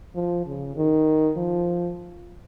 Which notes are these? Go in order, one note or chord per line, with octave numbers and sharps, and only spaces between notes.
F3
C#3
D#3
F3